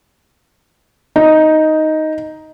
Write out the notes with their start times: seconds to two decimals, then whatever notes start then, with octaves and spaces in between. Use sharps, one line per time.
1.16 D#4